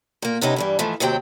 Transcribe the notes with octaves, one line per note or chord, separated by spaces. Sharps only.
A#2 A#3
F2 C3 B3 C#4 D#4
G2 E3 G3
G#2 E3 F3 A3
D#2 C3 F#3 C4 A#4 G5